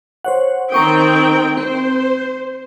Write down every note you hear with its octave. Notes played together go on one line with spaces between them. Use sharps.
C5 C#5 F#5
D#3 C4 G5 A#5 C#6 D#6
C4 C5